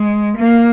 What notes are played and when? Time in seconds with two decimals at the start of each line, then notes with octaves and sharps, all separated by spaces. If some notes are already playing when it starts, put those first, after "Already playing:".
Already playing: G#3
0.38 A#3